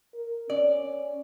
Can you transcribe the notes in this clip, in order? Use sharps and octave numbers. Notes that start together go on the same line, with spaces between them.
A#4
C#4 D5